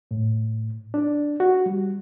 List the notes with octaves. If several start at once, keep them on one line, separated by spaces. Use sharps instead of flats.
A2
D4
F#4
G3